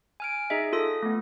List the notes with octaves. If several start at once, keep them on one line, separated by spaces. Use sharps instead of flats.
G#5 F6 D7
D#4 G#4 D#5 E5
F4 A4 D#6
A3 B3